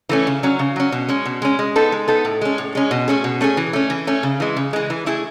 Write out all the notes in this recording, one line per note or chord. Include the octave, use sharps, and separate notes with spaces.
E3 A3 C#4
C#3
F#3 C#4
C#3
F#3 C#4
B2
G#3 C#4
B2
G#3 C#4
G#3
B3 D#4 A4
G#3
B3 D#4 A4
A2
G#3 C#4
A2
G#3 C#4
B2
A3 C#4 G#4
B2
A3 C#4 G#4
E3
A3 C#4
E3
A3 C#4
C#3
E3 G#3
C#3
E3 G#3
E3
A3 E4 G#4